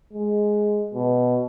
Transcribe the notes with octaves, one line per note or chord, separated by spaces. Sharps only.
G#3
B2